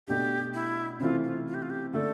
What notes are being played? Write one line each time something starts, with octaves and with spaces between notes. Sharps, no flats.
B2 A3 D4 G4
E4
C3 E3 A3 C4 E4 F4
F4
F4
G4
F4
G4
D3 A3 D4 A4